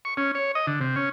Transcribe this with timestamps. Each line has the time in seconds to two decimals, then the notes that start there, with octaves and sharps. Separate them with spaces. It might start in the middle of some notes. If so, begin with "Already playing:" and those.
0.05 C#6
0.17 C#4
0.35 C#5
0.55 D#5
0.67 D3
0.81 C3
0.96 C#4